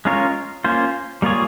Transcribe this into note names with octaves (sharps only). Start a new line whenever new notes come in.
G#3 C#4 F4 A#4 C#5
A#3 C#4 F4 C5
G3 A#3 F4 G#4 C#5